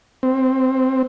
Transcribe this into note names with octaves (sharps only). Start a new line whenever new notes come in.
C4